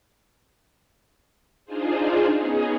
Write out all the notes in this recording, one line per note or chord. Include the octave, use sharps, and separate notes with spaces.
D4 D#4 F4 G#4 C5
B3 C#4 D#4 G#4